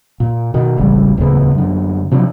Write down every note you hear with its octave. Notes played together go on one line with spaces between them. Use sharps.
A#2
B2 D#3
E1 A1 C#3 G3
D1 E2 C#3 B3
F#2 D3
C3 F3 F#3 D4